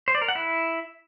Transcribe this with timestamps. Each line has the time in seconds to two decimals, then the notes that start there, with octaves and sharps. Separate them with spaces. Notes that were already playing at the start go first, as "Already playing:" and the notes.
0.08 C5
0.15 D5
0.22 A#4
0.28 F#5
0.35 E4